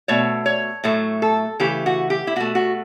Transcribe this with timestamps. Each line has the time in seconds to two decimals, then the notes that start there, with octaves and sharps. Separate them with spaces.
0.08 B2 A3 C#5
0.46 C#5
0.84 A2 F#3 A3
1.22 A4
1.60 C#3 E3 A3 G4
1.86 F#4
2.10 G4
2.27 E4
2.36 B2 A3 F#4
2.55 F#4